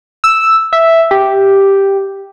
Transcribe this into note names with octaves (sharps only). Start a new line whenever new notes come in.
E6
E5
G4